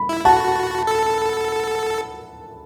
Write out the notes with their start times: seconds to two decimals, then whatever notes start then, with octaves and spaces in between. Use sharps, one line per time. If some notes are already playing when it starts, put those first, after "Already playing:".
Already playing: B5
0.09 E4
0.25 F#4 F#5 A5
0.87 A4